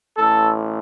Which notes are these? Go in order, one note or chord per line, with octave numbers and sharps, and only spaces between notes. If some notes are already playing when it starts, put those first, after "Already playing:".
A1 A2 A4